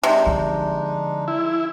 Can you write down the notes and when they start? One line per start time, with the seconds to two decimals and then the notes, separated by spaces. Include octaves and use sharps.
0.03 C3 G#3 D4 D#4
0.26 D3 F3
1.28 E4